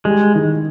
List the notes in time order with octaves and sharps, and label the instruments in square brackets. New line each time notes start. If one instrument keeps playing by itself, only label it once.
[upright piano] G3 [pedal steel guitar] G#3
[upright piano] D#3